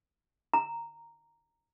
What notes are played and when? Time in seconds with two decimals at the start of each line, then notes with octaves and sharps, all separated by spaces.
0.54 A#5